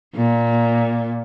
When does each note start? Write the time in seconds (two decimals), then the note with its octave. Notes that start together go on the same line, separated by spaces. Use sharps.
0.16 A#2